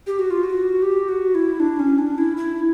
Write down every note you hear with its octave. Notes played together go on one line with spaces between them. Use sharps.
G4
F#4
F4
F#4
G4
F#4
E4
D4
C#4
D4
E4
E4